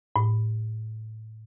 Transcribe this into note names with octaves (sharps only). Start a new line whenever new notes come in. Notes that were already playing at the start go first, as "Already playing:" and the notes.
A2